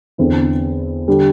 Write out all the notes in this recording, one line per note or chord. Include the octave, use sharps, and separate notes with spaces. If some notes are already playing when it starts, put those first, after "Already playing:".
E2 D3 C4 E4
D3 G3